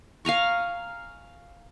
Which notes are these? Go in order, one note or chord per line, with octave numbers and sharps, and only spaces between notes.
F5 G#5 A#5 C#6